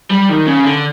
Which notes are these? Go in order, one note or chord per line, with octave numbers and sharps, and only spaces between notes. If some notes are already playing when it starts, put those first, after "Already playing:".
G3
D#3
C#3
D3